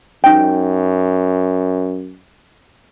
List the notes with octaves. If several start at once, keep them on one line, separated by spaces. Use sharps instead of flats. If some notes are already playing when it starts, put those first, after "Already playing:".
F#2 D#4 G5